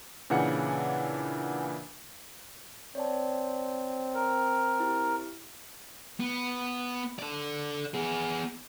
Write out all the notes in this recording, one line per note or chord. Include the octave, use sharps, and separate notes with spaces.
A#2 C#3 E3 D4 F#5 C#7
C4 C#5 D5 A5
A#4
E4 G4
B3
A4 D5
B3 G#4